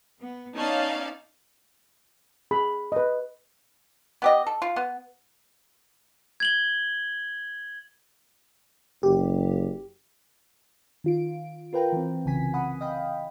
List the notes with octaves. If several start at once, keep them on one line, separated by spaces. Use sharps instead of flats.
B3
B3 C#4 D#4 D5 F5 A5
G#4 B5
B4 D#5
B3 G4 D#5
A4
F4
B3
G#6 F#7 G7
F#1 G4
D#3 F4 D7
F4 A#4 B4 G5 A#5
E3 C4
C2 C#3 E3 G#5 B6
F#5 B5 D#6
D#5 F5 G5 B5